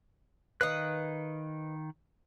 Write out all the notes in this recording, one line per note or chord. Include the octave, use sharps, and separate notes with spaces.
D#3 B4 D#5 F5 F#6